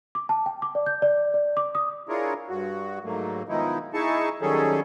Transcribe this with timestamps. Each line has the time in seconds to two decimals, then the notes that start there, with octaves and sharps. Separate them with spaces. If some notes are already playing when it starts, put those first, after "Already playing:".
0.15 D6
0.29 A5
0.46 G5
0.62 D6
0.75 D5
0.86 G6
1.02 D5
1.34 D5
1.57 D6
1.75 D#6
2.09 D4 E4 F4 G#4 A#4 C#5
2.49 G2 F#4
3.04 G#2 F#3 A3 A#3
3.49 B2 D#3 F3 G#3 D#4 E4
3.94 D#4 E4 G#4 A5 C#6
4.41 D#3 F#3 G3 C#4 G#4 A4